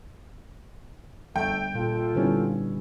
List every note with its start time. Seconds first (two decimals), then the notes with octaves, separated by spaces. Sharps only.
1.36 G1 A3 G5
1.75 A#2 F4 A4
2.15 D3 G3 B3 C#4 E4